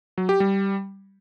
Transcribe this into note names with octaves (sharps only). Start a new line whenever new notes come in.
F#3
G4
G3